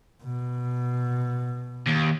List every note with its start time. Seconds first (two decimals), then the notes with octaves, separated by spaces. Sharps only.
0.23 B2
1.87 D#2